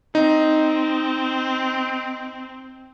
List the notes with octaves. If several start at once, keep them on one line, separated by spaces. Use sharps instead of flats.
C4 D#4